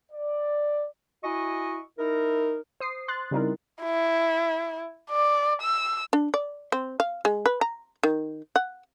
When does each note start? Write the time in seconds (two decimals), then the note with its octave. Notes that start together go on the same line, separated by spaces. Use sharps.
0.12 D5
1.23 E4 F#4 D#5 G#5 C#6
1.98 D#4 E4 A#4
2.80 C5 D#6 C7
3.08 C6 F#6 A6
3.31 C#3 G3 C4 D#4 E4 A#4
3.82 E4
5.10 D5
5.62 E6
6.13 D4
6.34 D5
6.72 C4
7.00 F5
7.25 G#3
7.46 B4
7.61 A#5
8.03 D#3
8.56 F#5